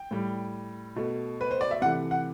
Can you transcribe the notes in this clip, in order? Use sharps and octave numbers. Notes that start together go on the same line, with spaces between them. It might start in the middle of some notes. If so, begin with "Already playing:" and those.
Already playing: G5
A2 G3
B2 A3
B4
C5
D5
E5
C3 E3 A3 F#5
F#5